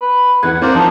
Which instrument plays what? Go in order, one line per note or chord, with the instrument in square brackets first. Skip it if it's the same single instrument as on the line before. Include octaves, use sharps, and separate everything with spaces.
[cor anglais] B4
[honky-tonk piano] E2 B4 G#6 [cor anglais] F#5
[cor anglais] A#3 [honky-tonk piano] C4 [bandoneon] A#4 C5 D5
[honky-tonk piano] F3 [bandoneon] D4 D#4